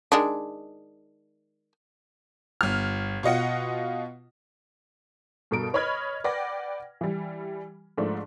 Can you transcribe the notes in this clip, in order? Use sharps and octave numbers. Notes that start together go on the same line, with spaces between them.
D#3 G#3 D4
G1 F6
B2 F4 D#5 F#5
G2 B2 A4 A#4 D7
B4 C#5 D#5 B5 F6 G#6
B4 D5 F#5 G5 D6 A#6
E3 G3
G#2 F3 A3 D4